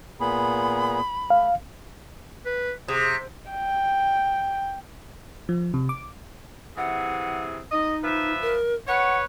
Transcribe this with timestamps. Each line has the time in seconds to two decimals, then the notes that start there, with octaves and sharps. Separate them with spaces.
0.20 A#2 B3 G#4 B5
1.30 A3 F5
2.45 B4
2.88 C3 G#4
3.51 G5
5.49 F3
5.74 C3
5.89 D6
6.77 C3 E3 G#4 F#5
7.72 D#4 D#5
8.04 F3 B4 E5
8.41 A#4
8.88 B4 C#5 F#5